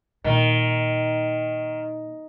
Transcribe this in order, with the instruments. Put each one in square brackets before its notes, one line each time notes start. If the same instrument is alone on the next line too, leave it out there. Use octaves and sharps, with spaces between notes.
[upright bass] A#2 [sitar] D#3